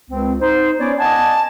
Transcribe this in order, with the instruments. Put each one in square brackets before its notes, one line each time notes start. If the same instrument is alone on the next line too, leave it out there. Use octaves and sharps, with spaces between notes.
[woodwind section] C#2 C4
D#4 C5
B3 C#4 C#5 D5
D5 D#5 F#5 G#5 A5